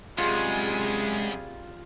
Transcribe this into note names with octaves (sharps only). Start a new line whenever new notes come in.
F#2 C3 G3 G#3 F4 G#4